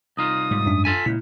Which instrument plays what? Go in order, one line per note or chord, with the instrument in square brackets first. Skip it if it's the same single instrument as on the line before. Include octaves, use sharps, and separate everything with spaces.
[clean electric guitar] C2 D#4 F4 [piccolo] D#6
[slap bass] G#2 G3
[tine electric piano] F#2 D4
[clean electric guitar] F4 A4 G#5 [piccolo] B6
[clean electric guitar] C#2 [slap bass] A#2 [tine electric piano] E4